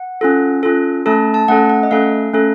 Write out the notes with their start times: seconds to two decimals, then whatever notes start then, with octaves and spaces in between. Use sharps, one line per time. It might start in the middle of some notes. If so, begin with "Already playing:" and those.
Already playing: F#5
0.21 C#4 F4 A4
0.63 C#4 F4 A4
1.06 A3 C#4 A4 A5
1.34 A5
1.48 A3 C#4 A4 F#5
1.69 F#5
1.83 D#5
1.91 A3 C#4 A4 F5
2.33 A3 C#4 A4